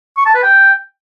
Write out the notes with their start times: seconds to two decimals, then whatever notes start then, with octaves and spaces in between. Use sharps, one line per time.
0.17 C#6
0.26 A5
0.34 B4
0.43 G5